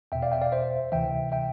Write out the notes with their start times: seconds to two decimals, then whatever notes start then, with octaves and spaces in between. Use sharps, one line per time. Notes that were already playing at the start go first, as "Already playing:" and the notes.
0.12 E2 B2 E5 G5
0.22 D5 F5
0.32 E5 G5
0.42 D5 F5
0.52 C5 E5
0.92 D2 C3 E3 E5 G5
1.32 E5 G5